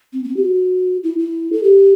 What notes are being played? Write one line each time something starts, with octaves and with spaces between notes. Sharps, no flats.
C4
B3
C4
G4
F#4
E4
E4
A4
G4